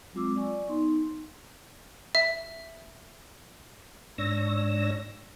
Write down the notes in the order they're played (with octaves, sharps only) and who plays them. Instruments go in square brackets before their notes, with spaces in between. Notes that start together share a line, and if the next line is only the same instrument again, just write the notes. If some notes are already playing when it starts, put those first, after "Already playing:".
[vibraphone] F#3 G#3 C4 F4 D6 E6
D5 G#5 C#6
B3 D#4 C6
[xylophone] E5
[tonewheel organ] G#2 D4 C#5 E6 A#6